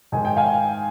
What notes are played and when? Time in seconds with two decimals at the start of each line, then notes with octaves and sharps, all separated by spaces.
0.12 G#2 D#3 G#3 G#5
0.25 G5
0.37 F5 G#5